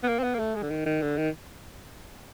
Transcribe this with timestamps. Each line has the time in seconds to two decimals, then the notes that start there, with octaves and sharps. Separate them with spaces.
0.04 B3
0.08 A#3
0.19 C4
0.24 B3
0.35 A#3
0.39 A3
0.55 G#3
0.63 D3
0.70 D#3
0.86 D#3
1.02 D3
1.18 D#3